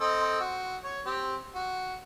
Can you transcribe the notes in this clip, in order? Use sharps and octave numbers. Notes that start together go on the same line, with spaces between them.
C4 A4 D#5
F#4
C#5
C4 G4
F#4